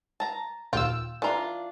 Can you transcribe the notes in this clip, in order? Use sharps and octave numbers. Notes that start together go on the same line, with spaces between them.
A5 A#5
A#1 D#2 F4 G5 E6
E3 D4 F4 A#5